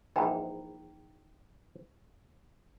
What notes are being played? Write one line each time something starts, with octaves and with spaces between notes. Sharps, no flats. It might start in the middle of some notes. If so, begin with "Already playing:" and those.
A#1 G#2 E3 G5 A#5 B5